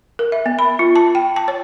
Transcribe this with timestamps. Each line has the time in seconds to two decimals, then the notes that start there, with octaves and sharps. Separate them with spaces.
0.19 A#4
0.32 E5
0.46 B3
0.59 B5
0.79 F4
0.95 A5
1.15 G5
1.36 A5
1.48 C#5